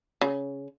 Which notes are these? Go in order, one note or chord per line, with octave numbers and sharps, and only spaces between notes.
C#3